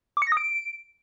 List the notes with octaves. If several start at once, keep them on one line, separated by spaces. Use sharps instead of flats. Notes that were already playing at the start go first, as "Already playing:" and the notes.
D6
C#7
A#6
D#6
D7